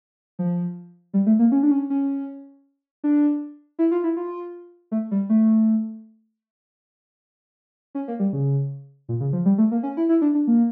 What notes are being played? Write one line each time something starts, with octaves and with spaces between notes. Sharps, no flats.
F3
G3
A3
A#3
C#4
D4
C#4
C#4
D4
E4
F4
E4
F4
A3
G3
A3
C#4
A#3
G3
C#3
A#2
C#3
F3
G3
A3
A#3
C#4
E4
E4
D4
D4
A#3